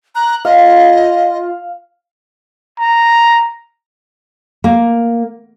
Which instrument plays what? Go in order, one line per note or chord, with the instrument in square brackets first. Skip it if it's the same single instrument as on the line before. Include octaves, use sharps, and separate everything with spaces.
[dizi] A#5 [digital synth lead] F#6
[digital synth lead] F4 [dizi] D#5 [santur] F5
[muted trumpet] A#5
[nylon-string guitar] A#3